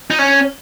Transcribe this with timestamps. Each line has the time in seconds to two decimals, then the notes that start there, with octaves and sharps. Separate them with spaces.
0.11 D#4
0.19 C#4